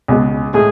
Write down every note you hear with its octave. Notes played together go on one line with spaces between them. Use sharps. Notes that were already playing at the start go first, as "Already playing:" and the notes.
C#2 B2 G#3
A2 G#3 G#4